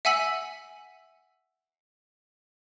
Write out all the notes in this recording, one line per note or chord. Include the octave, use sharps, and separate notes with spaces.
E5 F#5 G#5 E6 B6 F#7